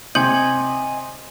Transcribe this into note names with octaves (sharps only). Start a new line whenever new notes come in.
C3 D#5 G#5 G6 C#7 F#7